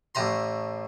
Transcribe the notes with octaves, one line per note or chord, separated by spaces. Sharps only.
A1 A2 A#5 C6